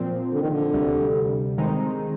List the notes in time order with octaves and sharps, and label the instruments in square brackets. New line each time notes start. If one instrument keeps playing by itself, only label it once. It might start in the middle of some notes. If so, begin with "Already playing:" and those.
Already playing: [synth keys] A#2 F3 C4
[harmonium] D3
D#3
D3
[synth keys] D2 C3 G3
D#3 G#3 C4 D#4